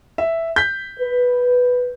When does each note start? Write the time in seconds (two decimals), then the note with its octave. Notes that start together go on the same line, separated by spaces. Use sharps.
0.18 E5
0.56 G6 B6
0.99 B4